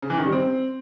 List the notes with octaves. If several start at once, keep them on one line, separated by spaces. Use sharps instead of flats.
C#3
E3
D#3
G3
C4